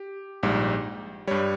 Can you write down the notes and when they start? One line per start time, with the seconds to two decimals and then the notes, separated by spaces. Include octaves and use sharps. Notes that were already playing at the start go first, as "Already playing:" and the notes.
Already playing: G4
0.43 A#1 G#2 G3
1.27 G2 G3 C#5